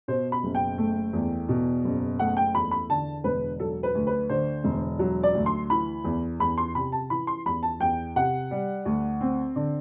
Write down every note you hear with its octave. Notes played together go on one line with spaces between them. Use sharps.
B2 C5
B5
F#1
G5
A3
E2
B2
F#1
A3 F#5
G5
E2 B5
B5
D3 A5
E1 B4
F#3 A4
B4
D2
B4
D3 C5
E1
F#3
D5
D2
C6
E3 B5
E2
E2 B5
C6
C3 B5
A5
E3 B5
C6
E2 B5
A5
E2 G5
C3 F#5
G3
D2
C4
D3